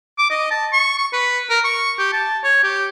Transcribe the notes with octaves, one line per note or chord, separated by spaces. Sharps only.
D6
D#5
A5
C#6
C#6
B4
A#4
C#6
G4
A5
C#5
G4